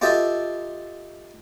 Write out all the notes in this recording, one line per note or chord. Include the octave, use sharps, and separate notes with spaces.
F4 G4 A4 D#5 E5 A5